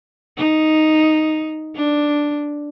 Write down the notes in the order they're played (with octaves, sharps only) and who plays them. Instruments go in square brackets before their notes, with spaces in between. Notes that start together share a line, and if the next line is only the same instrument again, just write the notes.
[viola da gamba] D#4
D4